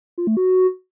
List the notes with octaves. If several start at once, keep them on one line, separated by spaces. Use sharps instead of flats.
F4
A3
F#4